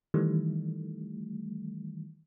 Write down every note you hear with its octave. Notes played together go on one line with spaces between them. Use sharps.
D#3 E3 G3 A3